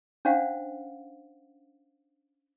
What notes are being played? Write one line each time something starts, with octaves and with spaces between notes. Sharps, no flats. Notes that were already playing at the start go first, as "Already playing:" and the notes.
C#4 D4 C5 F5 F#5